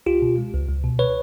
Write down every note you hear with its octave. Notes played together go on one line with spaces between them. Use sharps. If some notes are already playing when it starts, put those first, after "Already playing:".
C#2 F4 G4
B2
G#3
C#2
C#2
B2
B4 C#5